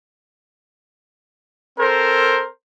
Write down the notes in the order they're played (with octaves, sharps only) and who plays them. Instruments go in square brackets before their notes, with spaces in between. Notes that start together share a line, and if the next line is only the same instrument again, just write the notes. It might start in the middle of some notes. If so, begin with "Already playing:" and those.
[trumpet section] C4 A4 A#4 C5